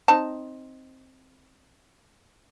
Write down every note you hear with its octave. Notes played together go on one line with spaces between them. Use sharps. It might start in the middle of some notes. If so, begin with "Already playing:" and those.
C4 D#4 A5